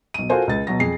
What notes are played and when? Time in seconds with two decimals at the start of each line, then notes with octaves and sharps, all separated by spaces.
0.14 B1 D#7
0.29 F4 F#4 A4 A#4 C5 G#5
0.47 C#2 A6
0.67 B2 F#3 A#6
0.80 F2 G#4 C7